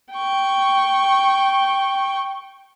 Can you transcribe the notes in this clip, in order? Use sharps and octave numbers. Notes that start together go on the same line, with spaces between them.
G5 C#6